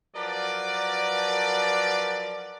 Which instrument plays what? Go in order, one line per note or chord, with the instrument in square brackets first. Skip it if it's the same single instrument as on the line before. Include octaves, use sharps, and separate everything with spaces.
[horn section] F3 F#3 A#4 B4 D5